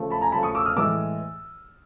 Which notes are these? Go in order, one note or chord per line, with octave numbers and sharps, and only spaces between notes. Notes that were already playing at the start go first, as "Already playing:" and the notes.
Already playing: C#3 F3 A3
A5 B5
G#5 A#5
C#3 F3 A3 A5 B5
C#6 D#6
D6 E6
D#6 F6
A2 E3 G#3 D6 E6